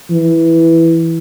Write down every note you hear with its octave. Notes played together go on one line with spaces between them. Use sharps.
E3